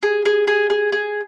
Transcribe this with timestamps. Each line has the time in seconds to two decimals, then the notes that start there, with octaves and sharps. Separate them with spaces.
0.03 G#4
0.25 G#4
0.47 G#4
0.70 G#4
0.92 G#4